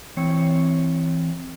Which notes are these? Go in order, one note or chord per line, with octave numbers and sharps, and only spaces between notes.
E3 C4 C#5